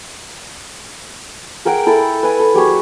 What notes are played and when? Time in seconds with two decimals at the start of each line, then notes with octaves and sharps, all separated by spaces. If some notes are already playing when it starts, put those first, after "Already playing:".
1.65 G#4 A#4 F#5 G5
1.86 E4 A4
2.23 B4 G#5
2.40 A4
2.54 F#3 G4 G#4 C#5